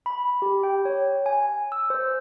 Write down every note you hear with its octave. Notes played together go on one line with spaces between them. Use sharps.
B5
G4
G5
C#5
G#5
E6
C5